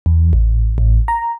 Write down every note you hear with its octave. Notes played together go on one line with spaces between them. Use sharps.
E2
A1
A1
A#5